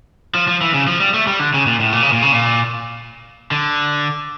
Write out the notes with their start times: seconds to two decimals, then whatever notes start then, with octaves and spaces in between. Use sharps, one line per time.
0.35 F3
0.48 F3
0.61 E3
0.74 C#3
0.88 F3
1.00 G3
1.14 A3
1.27 G3
1.40 D3
1.54 C#3
1.67 A#2
1.80 A2
1.92 A#2
2.03 C#3
2.12 A#2
2.22 C#3
2.32 A#2
3.51 D3